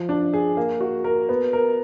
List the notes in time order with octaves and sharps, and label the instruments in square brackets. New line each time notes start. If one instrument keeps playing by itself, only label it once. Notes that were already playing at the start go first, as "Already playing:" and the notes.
Already playing: [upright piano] F3
D4
G#4
A#3
F#4
A#4
B3
A#4